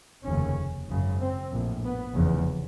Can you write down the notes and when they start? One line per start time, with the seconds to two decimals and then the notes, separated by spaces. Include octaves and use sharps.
0.25 F1 D#2 C#3 C#4
0.88 G#1 F#2 C#3
1.20 C4
1.51 A#1 A2
1.84 B3
2.14 F1 E2 C#3